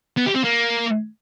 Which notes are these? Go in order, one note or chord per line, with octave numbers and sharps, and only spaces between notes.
B3
G4
C4
A#3